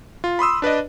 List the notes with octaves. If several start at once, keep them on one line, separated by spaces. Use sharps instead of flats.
F4
B5 C6 D#6 E6
D4 B4 D5 D#5